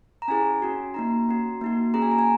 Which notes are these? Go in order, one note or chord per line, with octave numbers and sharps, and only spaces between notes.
A#5
C#4 E4 G#4 G#5
C#4 F#4
A#3 D#4 F#4 A#5
C#4 F#4
A#3 D#4 F#4
A#3 C#4 G#4 A#5
G#5
A#5
G#5